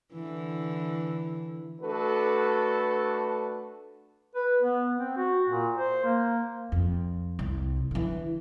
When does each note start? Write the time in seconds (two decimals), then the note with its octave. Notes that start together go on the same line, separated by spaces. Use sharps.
0.13 D3 E3
1.81 A3 D4 F#4 A4 B4
4.35 B4
4.62 B3
4.97 C4
5.17 F#4
5.49 A#2
5.78 C5
6.04 A#3
6.72 F2
7.39 C2
7.91 D3 E3